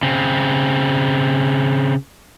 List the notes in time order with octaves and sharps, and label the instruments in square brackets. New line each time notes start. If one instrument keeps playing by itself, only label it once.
[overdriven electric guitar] C#3 C4